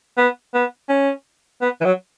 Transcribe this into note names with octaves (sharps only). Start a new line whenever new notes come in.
B3
B3
C#4
B3
E3
F#3